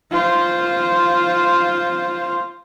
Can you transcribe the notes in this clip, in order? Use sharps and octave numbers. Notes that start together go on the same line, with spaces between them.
F4 C5